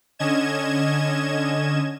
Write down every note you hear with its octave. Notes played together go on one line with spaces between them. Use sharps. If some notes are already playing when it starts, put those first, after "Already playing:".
D3 C#4 D#5 G#6 E7